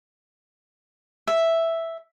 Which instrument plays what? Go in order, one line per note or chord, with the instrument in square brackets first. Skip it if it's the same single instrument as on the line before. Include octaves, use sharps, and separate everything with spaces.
[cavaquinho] E5